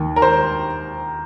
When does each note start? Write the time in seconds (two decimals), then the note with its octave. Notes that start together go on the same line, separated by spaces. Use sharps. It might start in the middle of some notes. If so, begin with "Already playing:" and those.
Already playing: D#2 D#3
0.16 A#4
0.22 C5